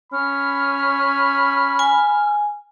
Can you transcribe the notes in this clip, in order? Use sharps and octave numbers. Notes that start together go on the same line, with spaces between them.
C#4 B5 F6
G#5